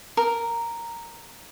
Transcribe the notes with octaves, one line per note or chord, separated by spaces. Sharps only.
A#4